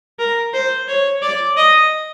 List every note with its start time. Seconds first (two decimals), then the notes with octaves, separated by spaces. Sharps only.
0.19 A#4
0.54 C5
0.88 C#5
1.22 D5
1.57 D#5